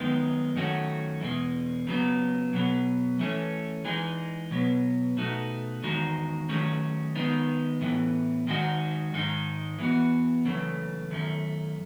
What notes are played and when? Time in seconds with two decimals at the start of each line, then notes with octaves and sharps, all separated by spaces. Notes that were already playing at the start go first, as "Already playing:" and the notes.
Already playing: F#2 D#3 G#3 B3 D#4
0.56 F#2 D#3 A3 C#4 F#4
1.21 E2 B2 G#3
1.87 C#3 F#3 B3
2.53 B2 F#3 B3
3.19 E3 A3 C#4
3.85 E3 G#3 D#4 G#4
4.51 B2 F#3 B3
5.17 B2 A3 D#4 F#4
5.83 E2 D#3 G#3 D#4 F#4
6.49 D#3 F#3 A3 C#4 G#4
7.16 D#3 G#3 B3 D#4
7.81 A2 E3 B3
8.47 D#3 G#3 D#4 F#4
9.13 G#2 D#3 G#3 D#4
9.79 E3 B3 F#4
10.45 F#2 C#3 E3 A3
11.11 F#2 D#3 A3